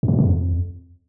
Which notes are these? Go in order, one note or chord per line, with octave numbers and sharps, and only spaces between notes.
F#2
C3
A2
C3
F2